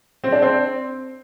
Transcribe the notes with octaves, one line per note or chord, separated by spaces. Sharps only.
C4
D4
C4